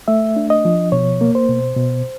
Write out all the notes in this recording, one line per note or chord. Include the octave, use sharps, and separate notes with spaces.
A3 E5
D4
D#5
F3
B2 C#5
A#3
C5
B2
B2